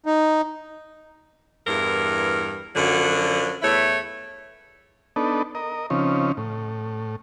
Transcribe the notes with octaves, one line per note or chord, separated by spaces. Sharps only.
D#4
E2 G2 E3 A#4
F#2 D3 F3 F#3
E2 A3 E4 C#5
B3 D4 D#4 A4
A#4 D#5
C#3 F3 C4 C#4 D#4
A2